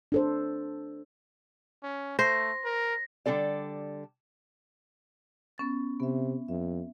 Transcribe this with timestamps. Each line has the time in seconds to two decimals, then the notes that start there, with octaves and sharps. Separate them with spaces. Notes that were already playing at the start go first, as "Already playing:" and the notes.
0.12 D4 A4 C5
1.83 C#4
2.19 A3 C5 A#6
2.65 A#4
3.26 D3 G3 D#4 A4 D5
5.58 B3 C#4 A6
6.00 C3 B3 E5
6.48 F2 E5